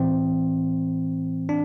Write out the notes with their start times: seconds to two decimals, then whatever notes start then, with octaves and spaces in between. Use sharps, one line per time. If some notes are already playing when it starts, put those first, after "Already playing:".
Already playing: A2 E3 C4
1.49 D4